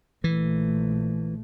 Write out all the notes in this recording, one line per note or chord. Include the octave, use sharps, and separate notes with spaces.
A#1 E3 A3